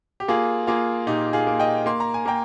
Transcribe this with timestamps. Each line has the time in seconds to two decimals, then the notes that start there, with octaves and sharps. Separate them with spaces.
0.20 G4
0.28 A#3 F4 G#4
0.67 A#3 F4 G#4
1.07 A#2 D#4 G4
1.33 F4 G#4
1.47 A#3
1.60 D#5 G5
1.86 A#3 C6
2.00 A#5
2.14 G#5
2.26 A#3 G5 A#5